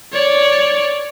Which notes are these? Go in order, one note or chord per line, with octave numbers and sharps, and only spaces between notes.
C#5 D5